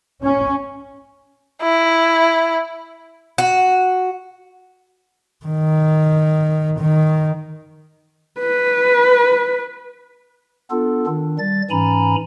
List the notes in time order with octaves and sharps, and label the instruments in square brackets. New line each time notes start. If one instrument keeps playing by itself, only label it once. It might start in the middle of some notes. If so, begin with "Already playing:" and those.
[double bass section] C#4
[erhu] E4
[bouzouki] F#4
[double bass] D#3
D#3
[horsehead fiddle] B4
[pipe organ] B3 D4 F4 A4
D#3 D4
G3 A6
G#2 E3 C#4 G#5 A#5 B5